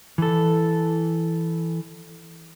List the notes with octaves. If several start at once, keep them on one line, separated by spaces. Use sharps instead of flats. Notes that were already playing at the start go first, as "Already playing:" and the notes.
E3 A4